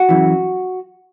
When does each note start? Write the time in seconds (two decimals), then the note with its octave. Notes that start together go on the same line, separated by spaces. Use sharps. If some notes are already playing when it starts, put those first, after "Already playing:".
Already playing: F#4
0.09 F#2 C#3 E3